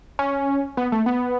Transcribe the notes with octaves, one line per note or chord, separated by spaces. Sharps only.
C#4
B3
A3
B3